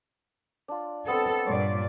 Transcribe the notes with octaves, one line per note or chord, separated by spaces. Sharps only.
D4 F4
B3 C4 A4
G2 A#2 C#5 D5 C6